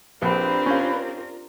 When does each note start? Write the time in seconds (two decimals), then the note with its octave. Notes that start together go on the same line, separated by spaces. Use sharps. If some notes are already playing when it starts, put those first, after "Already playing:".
0.22 A#1 C4 D4 F4 G4 A#4 B4
0.66 C#4 F5